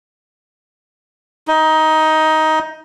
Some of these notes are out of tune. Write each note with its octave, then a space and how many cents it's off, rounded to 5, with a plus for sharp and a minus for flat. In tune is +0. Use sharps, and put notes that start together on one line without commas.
D#4 +15